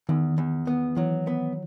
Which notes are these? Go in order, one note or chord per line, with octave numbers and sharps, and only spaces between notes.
E2 D#3
E2
B3
E3 F#3
B3